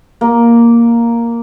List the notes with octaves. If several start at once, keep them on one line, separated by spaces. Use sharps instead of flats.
A#3